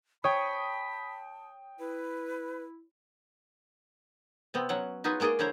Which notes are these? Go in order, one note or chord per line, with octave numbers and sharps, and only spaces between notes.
C#5 G5 A5 B5 D#6
E4 B4
C3 B3 C4
F#3 C#4 F#5
D#4 F4 F#4 G#4 B4
G#3 A#3 G#4 D5 D#5
D3 E4 C5 C#5 A#5